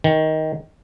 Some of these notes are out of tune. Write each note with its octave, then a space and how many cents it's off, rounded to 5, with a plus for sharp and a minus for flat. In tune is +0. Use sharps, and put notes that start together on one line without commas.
D#3 +15